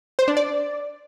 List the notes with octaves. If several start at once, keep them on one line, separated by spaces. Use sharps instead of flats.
C5
D4
D5